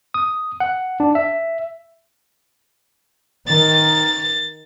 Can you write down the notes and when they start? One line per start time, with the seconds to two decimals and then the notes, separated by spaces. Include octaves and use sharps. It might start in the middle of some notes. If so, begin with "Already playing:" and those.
0.14 D#6
0.60 F#5
1.00 D4
1.15 E5
3.48 D#3 A6